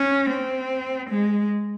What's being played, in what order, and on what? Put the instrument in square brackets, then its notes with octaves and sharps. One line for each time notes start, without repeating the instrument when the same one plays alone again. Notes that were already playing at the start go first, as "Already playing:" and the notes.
Already playing: [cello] C#4
C4
G#3